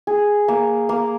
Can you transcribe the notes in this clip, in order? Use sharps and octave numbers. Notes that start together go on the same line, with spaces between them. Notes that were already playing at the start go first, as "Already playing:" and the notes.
G#4
A#3
A#3